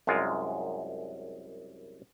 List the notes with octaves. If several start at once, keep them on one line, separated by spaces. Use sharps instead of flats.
C2 F#2 G#3 F4